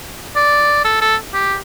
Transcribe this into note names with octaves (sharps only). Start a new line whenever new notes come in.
D5
A4
A4
G4